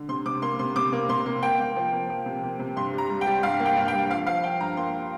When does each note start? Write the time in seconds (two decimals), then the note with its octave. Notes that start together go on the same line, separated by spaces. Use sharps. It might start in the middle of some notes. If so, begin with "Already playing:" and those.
Already playing: D3
0.09 C3 C6
0.26 C3 D6
0.42 A#3 C6
0.59 C3 C6
0.76 C3 D6
0.92 A#3
1.09 C3 C6
1.26 A#3
1.43 A#3 G5
1.59 A#3
1.76 F3
1.93 A#3
2.10 F3
2.26 C3
2.43 A#3
2.59 C3
2.77 G2 C6
2.93 G3
2.98 A#5
3.10 G3
3.21 G5
3.26 G3
3.43 G2 F5
3.60 A#3
3.66 G5
3.77 G2
3.88 G5
3.93 G2
4.10 F3 F5
4.27 F3 F5
4.44 F3 G5
4.60 G2 A#5
4.77 A#3 C6